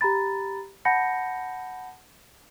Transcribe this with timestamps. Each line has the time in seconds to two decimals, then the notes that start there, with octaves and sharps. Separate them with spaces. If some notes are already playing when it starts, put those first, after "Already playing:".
0.01 G4 A#5 B5 A6
0.85 F#5 A5 B5 G6 A#6 C#7